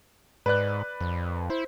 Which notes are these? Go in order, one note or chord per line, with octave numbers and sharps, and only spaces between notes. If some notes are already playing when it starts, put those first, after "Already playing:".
G#2 B4 D5 F#6
F2
E4 C5